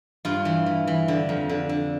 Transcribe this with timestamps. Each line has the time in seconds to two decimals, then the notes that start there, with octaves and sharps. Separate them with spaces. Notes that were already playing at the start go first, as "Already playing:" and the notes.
0.25 G2 F4
0.45 E3
0.66 E3
0.87 E3
1.08 D3
1.29 F2
1.49 D3
1.69 D3